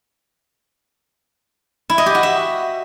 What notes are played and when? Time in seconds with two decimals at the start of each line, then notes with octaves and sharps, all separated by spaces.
1.90 E4
1.98 D#5
2.06 G4
2.15 F#4
2.23 E5